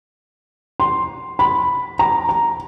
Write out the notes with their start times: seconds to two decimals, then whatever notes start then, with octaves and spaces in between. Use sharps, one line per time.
0.80 C6
1.39 B5
1.99 A#5
2.29 A#5